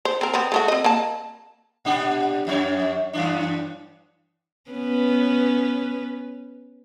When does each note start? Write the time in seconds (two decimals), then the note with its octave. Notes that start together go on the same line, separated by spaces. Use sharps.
0.05 C5
0.21 C4 A#4
0.34 B3 C4
0.52 G#3 A3 F#4
0.68 C4 D#5
0.84 A#3 A5
1.85 A#2 D4 G4
2.47 F2 D#4 C#5
3.13 F#2 E3 D4
4.71 B3 C#4 B4